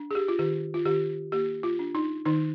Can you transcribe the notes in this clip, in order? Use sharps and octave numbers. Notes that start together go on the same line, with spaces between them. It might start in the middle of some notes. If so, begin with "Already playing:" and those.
Already playing: D4
G#4
G4
F4
D#3 G4
F4
D#3 G4
A#3 G4
F4
D4
D#4
D#3 D#4